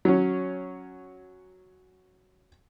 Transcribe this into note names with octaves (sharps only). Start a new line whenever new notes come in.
F#3 C#4